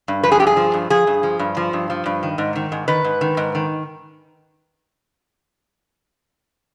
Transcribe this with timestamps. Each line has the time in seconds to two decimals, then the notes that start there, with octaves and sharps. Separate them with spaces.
0.08 G2
0.23 F3 B4
0.32 G#4
0.40 G2 G4
0.47 G#4
0.57 F3
0.74 G2
0.90 F3 G#4
1.07 G2
1.23 F3
1.39 G2
1.57 F3
1.73 G2
1.90 F3
2.06 G2
2.23 D#3
2.38 G#2
2.56 D#3
2.72 G#2
2.88 D#3 B4
3.04 G#2
3.21 D#3
3.37 G#2
3.55 D#3